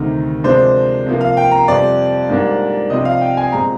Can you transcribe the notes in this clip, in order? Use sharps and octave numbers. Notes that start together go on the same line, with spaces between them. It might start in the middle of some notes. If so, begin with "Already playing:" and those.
Already playing: D2 C3 D#3 A#4
C3 F3 G#3 D4 C5
C3 F3 A#3
F5
G5
A#5
F2 C3 G3 C4 D5
G#2 G3 A#3 D4
C3 F3 C4 D#5
F5
G5
G#5
A#2 G#3 C4 A#5